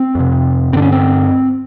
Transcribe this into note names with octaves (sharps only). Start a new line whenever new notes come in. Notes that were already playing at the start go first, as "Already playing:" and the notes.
Already playing: C4
F2 C3
G2 D3 C4 D4
C#4
C4